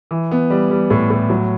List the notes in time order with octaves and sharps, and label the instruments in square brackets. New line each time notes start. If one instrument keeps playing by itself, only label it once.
[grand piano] E3
B3
G3
G3
A2
A2
F#3